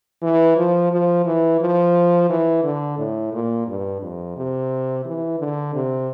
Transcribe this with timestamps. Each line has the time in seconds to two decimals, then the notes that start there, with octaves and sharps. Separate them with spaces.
0.22 E3
0.57 F3
0.92 F3
1.25 E3
1.61 F3
2.30 E3
2.64 D3
2.98 A2
3.33 A#2
3.67 G2
4.01 F2
4.36 C3
5.05 E3
5.39 D3
5.74 C3